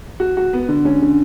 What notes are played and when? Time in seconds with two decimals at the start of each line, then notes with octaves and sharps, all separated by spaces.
0.20 F#4
0.37 F#4
0.53 B3
0.69 D3
0.85 C#4
1.02 D3